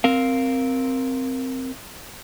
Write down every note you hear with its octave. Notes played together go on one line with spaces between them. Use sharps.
C4 A#4 F5